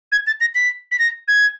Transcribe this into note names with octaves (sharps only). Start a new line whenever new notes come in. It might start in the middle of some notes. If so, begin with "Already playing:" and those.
G#6
A6
A#6
B6
B6
A#6
G#6